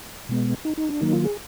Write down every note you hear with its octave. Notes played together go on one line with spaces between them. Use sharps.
B2 G#3 B3
D#4
D#4
D4
D#3 F#3 A#3 D#4
F4
G#4